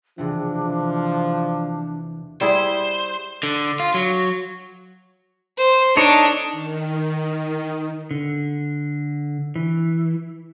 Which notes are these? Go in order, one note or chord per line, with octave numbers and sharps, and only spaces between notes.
E2 C3 E3 F3 D4
G3 E4 G#4 C5
D3
F4
F#3
C5
D4 D#4 A4 C#5
D#3
D3
E3